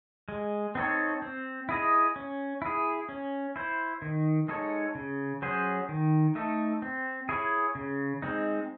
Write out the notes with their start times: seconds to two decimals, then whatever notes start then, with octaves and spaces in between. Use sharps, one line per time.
0.29 G#3
0.75 C4 D#4 A4 C#5
1.22 C4
1.69 E4 G#4 D#5
2.16 C#4
2.62 E4 G#4
3.09 C#4
3.56 E4 C5
4.02 D#3
4.49 G#3 D#4 A4 C#5
4.95 C#3
5.42 F#3 C#4 G#4 C5
5.89 D#3
6.35 A3 D#4 A4
6.82 C4
7.29 E4 G#4 C#5
7.75 C#3
8.22 G#3 C4 D#4